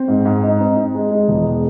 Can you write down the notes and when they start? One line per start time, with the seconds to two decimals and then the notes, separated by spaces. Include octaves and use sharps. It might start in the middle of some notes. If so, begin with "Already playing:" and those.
Already playing: C4
0.08 G#2
0.25 G#2
0.43 D#4
0.60 C4
0.77 D#4
0.95 G#3
1.12 G#3
1.28 E1